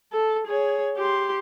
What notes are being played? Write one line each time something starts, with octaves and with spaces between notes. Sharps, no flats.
A4
G#4 C#5
G4 C6